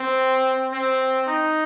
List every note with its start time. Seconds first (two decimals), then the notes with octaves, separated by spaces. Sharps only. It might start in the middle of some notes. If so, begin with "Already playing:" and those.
Already playing: C4
0.73 C4
1.27 D#4